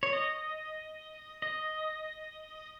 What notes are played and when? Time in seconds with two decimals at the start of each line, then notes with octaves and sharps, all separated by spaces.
0.03 C#5
0.13 D#5
1.42 D#5